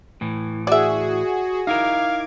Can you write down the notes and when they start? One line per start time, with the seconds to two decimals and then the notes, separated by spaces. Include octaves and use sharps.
0.21 A2 E3
0.67 F#4 G#4 D5 E5
1.67 D#4 E4 A#4 F5 D6 G#6